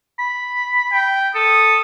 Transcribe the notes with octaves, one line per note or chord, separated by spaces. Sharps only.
B5
G5
A4 D#6